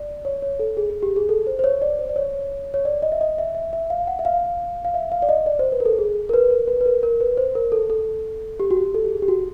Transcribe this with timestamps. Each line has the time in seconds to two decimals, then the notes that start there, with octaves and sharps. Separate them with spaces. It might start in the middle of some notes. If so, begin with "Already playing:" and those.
Already playing: D5
0.25 C#5
0.42 C#5
0.59 A4
0.77 G#4
0.90 G#4
1.03 G4
1.16 G#4
1.29 A4
1.47 C5
1.59 C5
1.64 C#5
1.82 D5
1.99 C5
2.09 D5
2.16 C#5
2.74 C#5
2.85 D5
3.02 D#5
3.12 E5
3.21 D#5
3.38 E5
3.55 E5
3.73 E5
3.90 F5
4.07 F#5
4.19 E5
4.25 F5
4.85 F5
4.94 E5
5.12 F5
5.22 D5
5.29 D#5
5.46 D5
5.59 C5
5.72 B4
5.80 A#4
5.86 A4
5.99 G#4
6.29 A#4
6.34 B4
6.50 A#4
6.68 B4
6.81 B4
6.86 A#4
7.03 A#4
7.21 B4
7.37 C5
7.55 A#4
7.72 A4
7.90 A4
8.60 G4
8.71 F#4
8.77 G4
8.94 A4
9.04 G4
9.12 G#4
9.22 G4
9.28 F#4